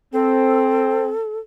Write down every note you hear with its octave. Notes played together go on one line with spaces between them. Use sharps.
C4 A4